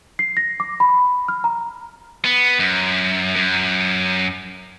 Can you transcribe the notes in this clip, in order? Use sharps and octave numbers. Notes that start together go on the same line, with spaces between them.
C7
A#6
D6
B5
F6
A#5
B3
F#2
F#2